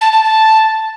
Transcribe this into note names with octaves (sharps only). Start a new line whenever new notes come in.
A5
A5
A5